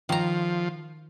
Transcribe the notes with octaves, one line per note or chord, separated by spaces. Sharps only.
D#3 F3 A#5